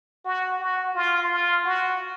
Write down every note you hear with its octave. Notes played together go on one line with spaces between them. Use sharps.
F#4
F#4
F4
F4
F#4